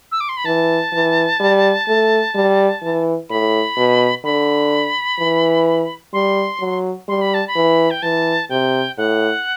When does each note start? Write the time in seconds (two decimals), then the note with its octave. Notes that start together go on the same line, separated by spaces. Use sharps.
0.12 E6
0.20 D6
0.29 C6
0.37 B5
0.45 E3 A5
0.93 E3
1.40 G3
1.88 A3
2.35 G3
2.82 E3
3.29 A2 B5
3.77 B2
4.24 D3 B5
5.19 E3
6.13 G3 C6
6.60 F#3
7.08 G3 C6
7.21 B5
7.34 A5
7.48 B5
7.55 E3
7.91 G5
8.02 E3 A5
8.50 C3 G5
8.97 A2 F#5